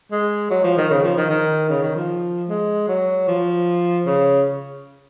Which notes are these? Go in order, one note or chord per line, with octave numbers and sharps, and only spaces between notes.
G#3
F#3
F3
D#3
C#3
F3
D#3
D#3
C#3
D#3
F3
G#3
F#3
F3
C#3